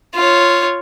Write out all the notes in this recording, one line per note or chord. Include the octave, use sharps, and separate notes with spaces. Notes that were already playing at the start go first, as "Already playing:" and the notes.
F4 C#5